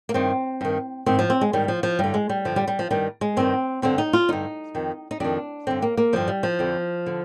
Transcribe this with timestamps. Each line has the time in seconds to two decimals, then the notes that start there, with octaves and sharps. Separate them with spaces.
0.09 A#3
0.14 G2 D#3 C4
0.61 G2 D#3
1.06 G#2 D#3 C4
1.19 F3
1.30 C4
1.41 G#3
1.53 G#2 D#3 G3
1.68 F3
1.83 F3
1.99 G2 D3 G3
2.14 G#3
2.29 G3
2.45 G2 D3 F3
2.56 G3
2.68 G3
2.79 F3
2.91 G2 D#3 G3
3.21 G#3
3.37 G2 D#3 C4
3.82 G2 D3 C4
3.98 D#4
4.13 F4
4.28 G2 D3 D#4
4.75 F2 D#3
5.11 D#4
5.20 F2 D#3 D4
5.67 G2 D3 C4
5.82 A#3
5.97 A#3
6.13 G2 D3 F3
6.28 G3
6.43 F3
6.59 F2 D3
7.06 D3